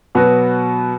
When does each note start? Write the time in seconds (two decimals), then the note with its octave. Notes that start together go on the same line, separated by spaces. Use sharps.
0.15 B2 F#3 B3 F#4 B4